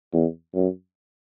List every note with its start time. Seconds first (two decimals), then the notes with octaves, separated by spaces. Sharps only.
0.13 E2
0.54 F#2